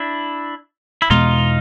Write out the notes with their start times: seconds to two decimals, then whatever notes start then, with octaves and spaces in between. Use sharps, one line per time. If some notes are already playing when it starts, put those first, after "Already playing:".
Already playing: D4 E4
1.02 E4
1.10 E2 B2 G#3 B3 D#4 F4